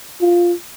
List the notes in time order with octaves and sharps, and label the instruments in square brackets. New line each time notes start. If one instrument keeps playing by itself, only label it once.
[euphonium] F4